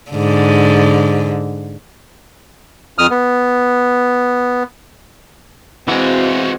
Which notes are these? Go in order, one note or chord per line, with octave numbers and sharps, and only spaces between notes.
G#2 D3
F2 D#6 F6
B3
E3 G#3 C4 E4 F#4